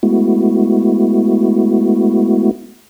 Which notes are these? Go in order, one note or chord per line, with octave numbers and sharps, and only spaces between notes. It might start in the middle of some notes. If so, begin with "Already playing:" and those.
G#3 A3 B3 E4 F#4